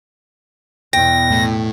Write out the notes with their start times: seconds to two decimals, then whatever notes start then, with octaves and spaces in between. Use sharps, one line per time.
0.93 E2 B2 G5 A#6
1.31 A2